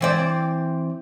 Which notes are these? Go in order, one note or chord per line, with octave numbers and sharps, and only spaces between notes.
E3 C4 D5